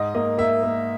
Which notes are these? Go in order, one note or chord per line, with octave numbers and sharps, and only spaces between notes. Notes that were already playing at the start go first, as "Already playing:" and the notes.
Already playing: G#2 D#5
A#3 D#5
A#3 E5
A#3